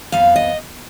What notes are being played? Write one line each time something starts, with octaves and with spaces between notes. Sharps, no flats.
F2 F3 B3 F5
D#5